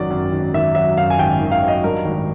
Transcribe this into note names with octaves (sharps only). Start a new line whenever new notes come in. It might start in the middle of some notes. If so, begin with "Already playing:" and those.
Already playing: G#1 F#2 D#3 F#3 D5
F#2
G#1
D#3 E5
F#3 E5
F#2 F5
G#5
G#1 G5
D#3
F5
F#3
D#5
G2 A#4
G#1